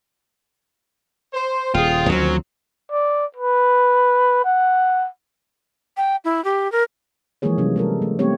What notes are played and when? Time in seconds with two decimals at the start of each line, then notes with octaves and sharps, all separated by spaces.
1.33 C5
1.75 D#1 F4 G#4 G5
2.09 D2 D#3 F3 F#3 C4 C#4
2.91 D5
3.37 B4
4.45 F#5
5.97 G5
6.24 E4
6.44 G4
6.72 A#4
7.42 E3 F3 G#3 A#3 G#4 C#5
7.58 C3 F#3 G3 C#4
7.76 G#3 A4 A#4
8.02 A3
8.19 G3 A3 A#3 C4 G4 C#5